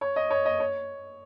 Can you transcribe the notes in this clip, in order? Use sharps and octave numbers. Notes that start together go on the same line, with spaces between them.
C#5
D#5
C#5
D#5
C#5